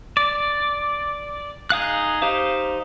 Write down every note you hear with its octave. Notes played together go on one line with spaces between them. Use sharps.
D5
D#4 G#4 F5 F#6
D#4 G4 C5 F5